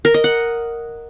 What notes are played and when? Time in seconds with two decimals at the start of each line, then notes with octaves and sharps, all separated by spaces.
0.05 A#4
0.14 D#5
0.24 F#5